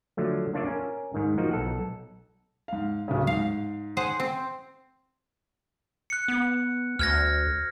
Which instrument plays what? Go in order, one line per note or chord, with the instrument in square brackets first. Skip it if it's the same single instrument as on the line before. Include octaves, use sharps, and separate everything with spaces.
[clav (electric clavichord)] D3 F3 F#3 A3
A#3 D4 F4 C#5 D5 E5
C#4 A#4
G#2 D#3
F3 A#3 D#4 F#4
B1 A4 F#5
[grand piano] G#2 F5
D1 C#3
[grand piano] G#2 [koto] F5
[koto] G#4 C5 F#5
C4
[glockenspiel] F#6 C#7
[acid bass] B3
[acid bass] D2 [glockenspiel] F6 G#6 A#6